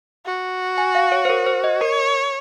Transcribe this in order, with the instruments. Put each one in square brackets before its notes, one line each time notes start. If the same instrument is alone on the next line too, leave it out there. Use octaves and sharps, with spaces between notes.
[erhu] F#4
[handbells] G#5
F5
C#5
C5
A#4
C5
D#5
[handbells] A#4 [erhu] C#5